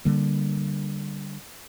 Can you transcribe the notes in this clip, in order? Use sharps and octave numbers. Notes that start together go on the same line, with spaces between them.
D3 G3 A#3